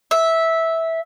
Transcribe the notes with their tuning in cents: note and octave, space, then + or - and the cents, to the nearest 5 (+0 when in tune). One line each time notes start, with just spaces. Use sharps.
E5 -10